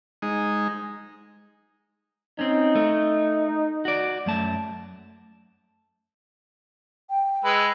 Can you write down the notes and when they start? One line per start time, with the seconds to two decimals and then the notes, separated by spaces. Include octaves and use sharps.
0.22 G#3 D#4
2.39 C4 C#4 D#4
2.76 A3
3.85 F#4 D5
4.26 F#2 A3 A5
7.10 G5
7.45 G#3 B4 E6